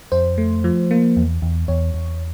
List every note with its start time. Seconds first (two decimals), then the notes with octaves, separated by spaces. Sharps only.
0.12 F2 C5
0.38 A3
0.64 F3
0.91 A#3
1.17 E2
1.42 E2
1.68 E2 C#5
1.94 E2